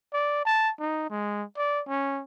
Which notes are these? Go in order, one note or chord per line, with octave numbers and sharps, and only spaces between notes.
D5
A5
D#4
G#3
D5
C#4